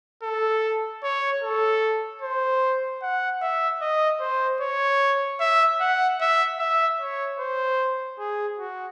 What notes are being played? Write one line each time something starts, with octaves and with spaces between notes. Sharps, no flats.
A4
C#5
A4
C5
F#5
E5
D#5
C5
C#5
E5
F#5
E5
E5
C#5
C5
G#4
F#4